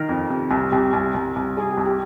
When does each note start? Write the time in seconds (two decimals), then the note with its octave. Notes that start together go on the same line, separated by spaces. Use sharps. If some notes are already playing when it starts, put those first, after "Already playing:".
Already playing: D#3 A#4
0.09 F2
0.30 C3
0.51 C2
0.72 C2 G4
0.93 C2
1.14 C2
1.36 C2
1.57 G3 G#4
1.71 G4
1.78 C2
1.85 G4